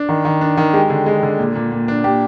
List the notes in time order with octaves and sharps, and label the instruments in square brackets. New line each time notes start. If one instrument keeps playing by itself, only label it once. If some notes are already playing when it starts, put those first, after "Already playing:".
Already playing: [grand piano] D4
D#3
D#3
D4
D#3
G#3 G4
D3
G#3
D3
A#2
A#2
A#2
D4
A#2 G4